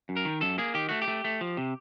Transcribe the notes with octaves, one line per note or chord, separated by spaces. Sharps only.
F#2
A#4
D#3
F#2 A4
A#3 G#4
D#3 G4
A3 F#4
G4
A3
A3
F3
C3